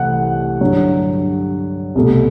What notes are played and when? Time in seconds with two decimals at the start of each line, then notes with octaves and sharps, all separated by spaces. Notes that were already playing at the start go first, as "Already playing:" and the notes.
Already playing: C2 E3 A3 C4 F#5
0.61 G2 D3 F#3
1.95 C2 B2 A3